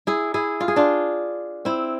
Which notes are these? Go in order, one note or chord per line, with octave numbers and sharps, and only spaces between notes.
E4 G#4
E4 G#4
F4
G#4
D4 F4
C4 E4